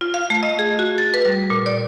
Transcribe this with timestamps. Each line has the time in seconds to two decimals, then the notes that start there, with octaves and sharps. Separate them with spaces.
0.01 F4
0.14 F5
0.30 A3
0.43 D#5
0.59 G#4
0.79 F#4
0.98 A6
1.14 B4
1.25 G3
1.50 A#2
1.66 D5